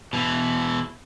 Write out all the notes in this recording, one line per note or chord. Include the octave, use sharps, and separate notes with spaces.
B2 E3